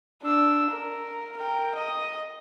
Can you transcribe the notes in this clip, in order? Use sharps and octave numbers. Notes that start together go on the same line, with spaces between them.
D4 E6
A#4
A#4 G5
D#5 D#6